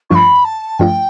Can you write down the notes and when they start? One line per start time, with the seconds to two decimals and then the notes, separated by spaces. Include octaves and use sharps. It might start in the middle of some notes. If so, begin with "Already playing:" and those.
0.10 G2 F3 A3 D4 F4 B5 C#6
0.45 A5
0.79 G2 F3 A3 D4 F4 G5